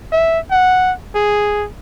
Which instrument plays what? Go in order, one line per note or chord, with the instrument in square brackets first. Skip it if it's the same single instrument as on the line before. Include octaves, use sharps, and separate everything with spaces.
[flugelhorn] E5
F#5
G#4